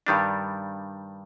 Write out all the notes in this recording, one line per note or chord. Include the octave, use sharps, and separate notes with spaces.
G2 D#3 G3 D4